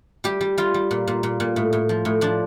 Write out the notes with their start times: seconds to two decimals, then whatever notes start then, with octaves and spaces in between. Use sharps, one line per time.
0.24 G3 G4
0.41 G3
0.58 G3 F4
0.74 G3
0.91 A#2
1.08 A#2
1.23 A#2
1.40 A#2
1.56 A2
1.73 A2
1.89 F3
2.05 A2
2.21 F3 D4